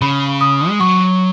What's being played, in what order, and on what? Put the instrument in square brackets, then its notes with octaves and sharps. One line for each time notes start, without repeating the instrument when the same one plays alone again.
[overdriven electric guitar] C#3 [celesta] B5
[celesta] D#6
[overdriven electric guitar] G#3
[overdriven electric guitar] F#3 [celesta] C#6